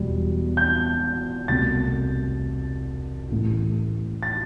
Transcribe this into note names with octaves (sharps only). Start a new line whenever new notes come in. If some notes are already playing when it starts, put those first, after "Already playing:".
Already playing: E1 E2 B2 G3
G6
C2 B2 A3 A6
A1 A2 E3 A3
A6